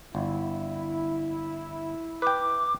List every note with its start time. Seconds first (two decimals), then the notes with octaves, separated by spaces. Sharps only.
0.15 G1 E4
2.22 B4 G5 D6